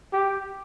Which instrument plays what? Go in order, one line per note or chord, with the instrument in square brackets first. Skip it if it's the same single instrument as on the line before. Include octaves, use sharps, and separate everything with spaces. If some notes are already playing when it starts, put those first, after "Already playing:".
[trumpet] G4